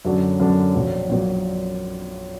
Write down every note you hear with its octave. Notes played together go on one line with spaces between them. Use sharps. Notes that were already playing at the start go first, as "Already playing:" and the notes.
F#2 D3 F#3 D4
F#2 D3 F#3 D4
A#1 A#2 F#3
A#1 A#2 F#3